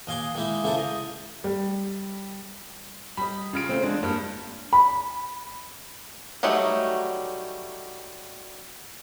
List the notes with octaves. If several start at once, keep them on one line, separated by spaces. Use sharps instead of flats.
D#2 D#5 F5 G#5 C6 D6
D#3 G#3 A#3 D#4 E4
C#3 A#3 E4 F4 A4 C5
D#5
G3
G3 D#5 B5
C#3 F4 D7
G3 A3 C4
E2 G#3 D4
G2 A#3
B5
F#3 G3 A3 D#4 F#4